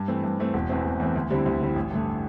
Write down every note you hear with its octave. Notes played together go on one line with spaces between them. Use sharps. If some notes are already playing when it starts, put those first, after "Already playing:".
Already playing: G2
E3 A3 C4
G2
E3 A3 C4
E1
E2 E3 A3 C4
E1
E2 E3 A3 C4
D2
D3 G3 C4 E4
D2
D3 G3 C4 E4
A1
G2 D3 A3